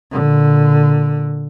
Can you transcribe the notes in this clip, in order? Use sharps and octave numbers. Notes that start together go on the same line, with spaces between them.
A#2 D3